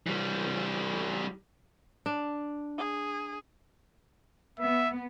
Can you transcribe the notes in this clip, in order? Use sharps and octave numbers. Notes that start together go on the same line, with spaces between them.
E3 G3
D4
G#4
B3 E5